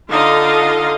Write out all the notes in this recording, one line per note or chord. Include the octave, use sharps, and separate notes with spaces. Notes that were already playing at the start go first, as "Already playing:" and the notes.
D3 D#4 F4 D#5 F5